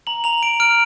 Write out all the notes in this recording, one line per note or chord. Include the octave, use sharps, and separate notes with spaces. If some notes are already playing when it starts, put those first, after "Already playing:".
A#5 F#7
A#5 F7
A#5 D7
F6 D7